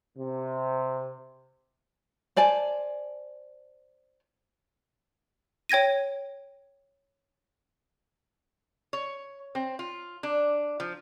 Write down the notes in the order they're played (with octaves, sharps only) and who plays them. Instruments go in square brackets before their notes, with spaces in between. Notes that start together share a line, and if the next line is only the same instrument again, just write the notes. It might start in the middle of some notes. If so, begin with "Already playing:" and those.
[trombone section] C3
[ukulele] C5 D5 G#5 A5
[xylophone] C#5 G5 G#6 A#6 D#7
[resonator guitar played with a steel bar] C#5
C4
F4
D4
F3